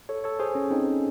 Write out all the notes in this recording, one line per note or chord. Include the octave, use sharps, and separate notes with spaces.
A4 C#5
A4 C#5
G#4 C5
C#4
C4 D#4